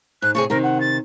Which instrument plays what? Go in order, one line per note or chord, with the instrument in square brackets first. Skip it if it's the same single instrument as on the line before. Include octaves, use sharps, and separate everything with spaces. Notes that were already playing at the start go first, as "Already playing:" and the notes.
[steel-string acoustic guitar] G#2 [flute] F#6
[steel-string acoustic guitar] A2 C3 G#4 [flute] C#6
[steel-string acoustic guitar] C3 D#3 [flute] A#4
[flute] F#5
A6